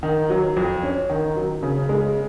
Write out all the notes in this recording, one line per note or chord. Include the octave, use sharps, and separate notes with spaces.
D#3
F#3
F2
C#4
D#3
F#3
C#3
G#3